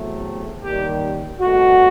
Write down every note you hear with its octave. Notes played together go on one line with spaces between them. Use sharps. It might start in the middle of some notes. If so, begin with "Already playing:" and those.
Already playing: E2 C3 F#3 A3
D#2 D#3 G3 G4
C2 B2 A3 F#4